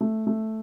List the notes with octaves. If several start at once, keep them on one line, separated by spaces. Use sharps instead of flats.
A3
A3